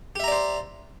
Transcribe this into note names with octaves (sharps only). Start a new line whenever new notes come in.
G4 C5 D5 E5 A#5